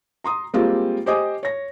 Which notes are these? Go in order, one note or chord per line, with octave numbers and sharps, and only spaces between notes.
A#5 C6 D#6
G3 G#3 A#3 C4 F4 G4
G4 C5 D#5 G#5 D6 D#6
C#5 A#6